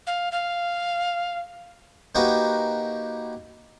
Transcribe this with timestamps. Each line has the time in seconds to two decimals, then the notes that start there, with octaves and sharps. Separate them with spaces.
0.07 F5
0.32 F5
2.15 A#3 D#4 F#4 G4 A#4 B4